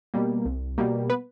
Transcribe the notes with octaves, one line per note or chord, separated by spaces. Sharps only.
B2 G3 A#3
C2
B2 G3 A#3
B3 B4